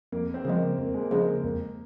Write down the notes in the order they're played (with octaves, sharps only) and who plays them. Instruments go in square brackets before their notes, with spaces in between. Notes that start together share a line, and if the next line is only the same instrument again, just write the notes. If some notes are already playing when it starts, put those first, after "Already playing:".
[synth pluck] F2 [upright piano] A#3
[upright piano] C4
[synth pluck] C#3 F3 G#3
[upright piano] A#3
[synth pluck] F2 [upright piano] A#3
[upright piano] G#3
A#3
[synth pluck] C#3 F3 G#3
[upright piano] A#3
[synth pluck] F2 [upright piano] A#3